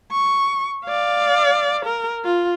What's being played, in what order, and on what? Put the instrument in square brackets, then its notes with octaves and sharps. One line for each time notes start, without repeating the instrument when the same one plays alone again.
[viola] C#6
D5 F5
A#4
F4